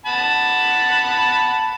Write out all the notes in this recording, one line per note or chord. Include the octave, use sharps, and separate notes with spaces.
F#5 A5 B5